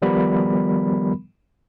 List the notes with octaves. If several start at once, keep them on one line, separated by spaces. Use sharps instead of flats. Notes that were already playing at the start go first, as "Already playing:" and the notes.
D#3 F3 G3 B3 A#4 B5